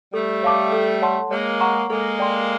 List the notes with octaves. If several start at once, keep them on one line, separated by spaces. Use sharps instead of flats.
G3 A3 A4
C#5 F5 A5 D6
A4
C#5 F#5 A5 C6
G#3 A#3 C#5
F#5 A#5 C#6
G#3 A#3 A4
D5 G5 C6